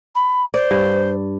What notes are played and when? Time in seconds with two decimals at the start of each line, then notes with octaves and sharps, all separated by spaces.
0.15 B5
0.54 C5 D5
0.71 G2